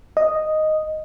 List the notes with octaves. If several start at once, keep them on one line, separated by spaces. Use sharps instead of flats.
D#5